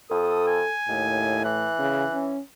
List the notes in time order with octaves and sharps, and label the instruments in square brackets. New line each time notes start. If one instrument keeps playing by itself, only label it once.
[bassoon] F2 [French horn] A4 [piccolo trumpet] D#6
[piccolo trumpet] G#5
[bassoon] D#2 [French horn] A2
[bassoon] E3 [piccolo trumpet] F#6
[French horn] C#3
C#4